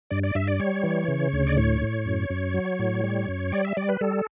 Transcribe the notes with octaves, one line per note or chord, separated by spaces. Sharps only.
G2 D5
D5
G2 E5
D5
G3 C#5
E3
C#3
D2
D5
A2 C#5
A2
F#2
F#2
F#3
A2
G3
F#2
G3 D5
E5
G3 D5
B4
G3 A4